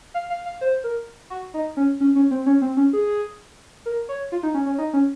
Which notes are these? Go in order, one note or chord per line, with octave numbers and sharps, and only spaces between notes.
F5
F5
F5
C5
A#4
F#4
D#4
C#4
C#4
C#4
C4
C#4
C4
C#4
G#4
A#4
C#5
F4
D#4
C#4
C#4
D#4
C#4